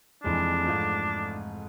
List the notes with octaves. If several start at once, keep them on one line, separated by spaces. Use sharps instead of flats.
F1 F2 C3 E3 G#3 D4
G#2 F3 A3